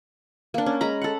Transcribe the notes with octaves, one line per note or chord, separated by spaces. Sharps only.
A#3 D4
C#4
G#3 A#5 B5
A4 F#5